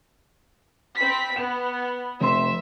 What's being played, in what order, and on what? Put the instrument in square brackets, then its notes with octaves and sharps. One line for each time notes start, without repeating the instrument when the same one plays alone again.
[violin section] C4 B5 B6
[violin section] B3 [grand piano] E7
[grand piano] F1 C4 C6 [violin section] E5